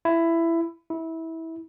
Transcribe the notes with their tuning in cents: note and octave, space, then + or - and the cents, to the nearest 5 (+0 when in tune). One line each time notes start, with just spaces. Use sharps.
E4 +15
E4 -20